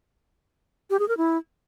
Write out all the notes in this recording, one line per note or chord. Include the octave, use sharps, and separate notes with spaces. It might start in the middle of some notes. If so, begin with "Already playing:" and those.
G4
G#4
A#4
E4